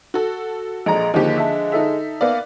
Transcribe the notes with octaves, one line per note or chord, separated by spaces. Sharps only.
F#4 A4
A#1 G#3 A#5
D#2 D3 F3 G#3 A#3 G4
E5 A5
D#4 A4 E5
A#3 B3 D5